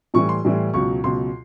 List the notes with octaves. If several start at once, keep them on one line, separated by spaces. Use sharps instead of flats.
A2 E3 G3 C#6
C6
A2 E3 G3
C#2 B2 F#3 C#6
C#2 B2 F#3 C6